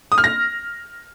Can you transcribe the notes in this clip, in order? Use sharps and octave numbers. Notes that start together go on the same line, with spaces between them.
D#6
F6
A#6